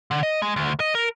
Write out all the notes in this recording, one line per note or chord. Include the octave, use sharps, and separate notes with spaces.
D3
D#5
G#3
D2
D#5
A#4